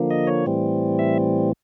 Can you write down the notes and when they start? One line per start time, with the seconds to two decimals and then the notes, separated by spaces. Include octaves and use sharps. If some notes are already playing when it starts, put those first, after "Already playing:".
Already playing: D3 F3 A#3
0.10 D#5
0.27 C#5
0.46 A2 E3 G3 C4
0.99 E5